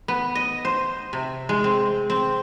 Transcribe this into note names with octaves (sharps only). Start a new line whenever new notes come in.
B3
D#5
C5
C3
G#3
C4
C4